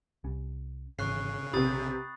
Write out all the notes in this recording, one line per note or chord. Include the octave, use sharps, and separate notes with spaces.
C2 G3 C#4
G#1 C#3 E3 C#6 F#6 C7
A#1 C3 B3 B5 D#6 A6